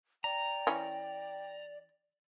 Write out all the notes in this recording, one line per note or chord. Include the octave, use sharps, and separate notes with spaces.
D5 G5 A#5
E3 C#4